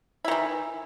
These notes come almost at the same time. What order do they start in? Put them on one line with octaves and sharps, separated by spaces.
E4 D#3 E3